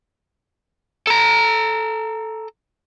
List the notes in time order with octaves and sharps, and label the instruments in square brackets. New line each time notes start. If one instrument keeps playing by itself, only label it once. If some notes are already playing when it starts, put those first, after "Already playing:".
[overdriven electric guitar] A4 A#5